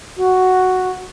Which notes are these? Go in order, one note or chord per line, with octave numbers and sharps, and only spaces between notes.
F#4